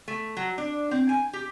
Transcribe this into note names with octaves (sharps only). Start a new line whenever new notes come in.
A3
F#3
D4
C4
G#5
G4